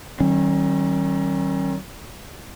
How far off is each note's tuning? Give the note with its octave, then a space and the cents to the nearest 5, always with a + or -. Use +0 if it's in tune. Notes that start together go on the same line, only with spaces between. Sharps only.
D#3 +0 F#3 +45 C#4 -35